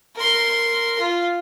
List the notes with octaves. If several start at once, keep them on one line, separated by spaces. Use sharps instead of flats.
A#4 C6
F4